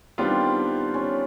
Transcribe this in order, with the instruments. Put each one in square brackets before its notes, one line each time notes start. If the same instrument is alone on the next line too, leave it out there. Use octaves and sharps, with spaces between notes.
[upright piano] D#3 G3 B3 D4 F4 [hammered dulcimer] C4
[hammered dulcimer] C#4